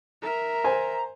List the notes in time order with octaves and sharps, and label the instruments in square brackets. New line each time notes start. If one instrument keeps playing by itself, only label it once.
[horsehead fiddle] A#4 E5 [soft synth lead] A#5
[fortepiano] C5 G#5